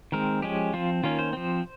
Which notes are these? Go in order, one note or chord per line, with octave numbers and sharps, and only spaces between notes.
D#3 G#3 C4 A#4
F3 G#3 C#4 G4
F3 C4 F4
D#3 A#3 C#4 F4
C5
F3 C4